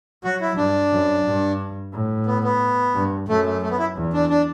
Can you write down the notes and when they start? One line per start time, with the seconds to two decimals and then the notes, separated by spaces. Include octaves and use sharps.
0.23 F#3 F#4
0.41 E4
0.57 G2 D4
0.91 F#2
1.26 G2
1.93 A2
2.26 B3
2.44 B3
2.94 G2
3.29 F#2 A3
3.46 A3
3.62 A3
3.71 B3
3.79 E4
3.96 E2
4.13 D4
4.30 D4